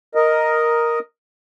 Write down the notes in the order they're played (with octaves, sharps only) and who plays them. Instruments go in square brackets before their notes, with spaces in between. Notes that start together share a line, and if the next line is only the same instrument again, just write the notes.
[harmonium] A#4 D#5